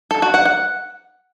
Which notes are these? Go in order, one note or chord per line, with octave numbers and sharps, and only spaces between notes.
A4
F#4
F#5
F#5